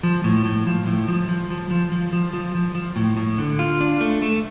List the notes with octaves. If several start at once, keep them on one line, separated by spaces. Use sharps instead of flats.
F3
A2
A2
F3
A2
F3
F3
F3
F3
F3
F3
F3
F3
F3
A2
A2
D3
F4
D4
A3
A3